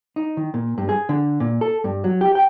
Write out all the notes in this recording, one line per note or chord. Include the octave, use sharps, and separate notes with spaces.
D#4
D#3
A#2
G2
G#4
D3
A#2
A4
G2
F#3
G4
G5